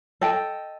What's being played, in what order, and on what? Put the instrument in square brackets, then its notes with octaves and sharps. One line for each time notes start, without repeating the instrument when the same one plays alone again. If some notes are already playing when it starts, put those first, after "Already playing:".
[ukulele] A4 D#5 G5